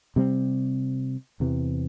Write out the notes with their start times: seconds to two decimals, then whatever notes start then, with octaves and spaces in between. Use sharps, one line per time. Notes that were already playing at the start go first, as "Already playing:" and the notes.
0.16 C3 G3 C4
1.40 E2 C3 E3